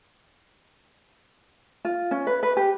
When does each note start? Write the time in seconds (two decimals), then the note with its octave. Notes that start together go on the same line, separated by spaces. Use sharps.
1.85 F4
2.11 C#4
2.27 B4
2.43 B4
2.57 G4